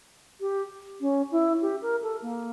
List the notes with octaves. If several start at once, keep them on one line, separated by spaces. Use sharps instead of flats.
G4
C#4
E4
G4
A#4
A4
A#3